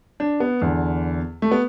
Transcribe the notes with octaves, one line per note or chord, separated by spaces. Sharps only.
D4
B3
E2 D3
A3
B3